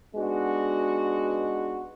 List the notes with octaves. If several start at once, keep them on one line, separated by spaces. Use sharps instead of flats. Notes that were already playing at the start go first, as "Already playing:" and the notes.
G#3 B3 D4 D#4 F#4